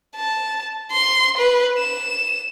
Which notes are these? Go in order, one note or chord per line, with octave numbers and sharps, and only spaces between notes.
A5
C6
B4
E7